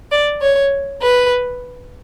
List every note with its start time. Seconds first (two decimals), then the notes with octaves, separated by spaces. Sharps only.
0.11 D5
0.41 C#5
1.01 B4